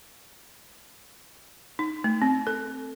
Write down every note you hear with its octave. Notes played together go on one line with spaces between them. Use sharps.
D#4
A3
C4
A4